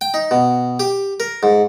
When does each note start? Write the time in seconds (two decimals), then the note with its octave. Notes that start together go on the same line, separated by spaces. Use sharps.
0.01 G5
0.14 D#4
0.31 B2
0.80 G4
1.20 A#4
1.43 G#2